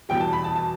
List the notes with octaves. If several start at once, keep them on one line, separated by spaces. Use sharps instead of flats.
E2 B2 G3 G5
A5
B5
A5
A5